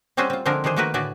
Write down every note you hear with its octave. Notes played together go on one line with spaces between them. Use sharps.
G3 C4 C#4 F#4 G#4 C5
C4 F4
D3 F3 G#3 C4 D4 A#4
D#3 F3 D4 G#4 C5
D#3 A3 A#3 F#4 A#4 B4
A2 D3 F#4 G#4 D5 E5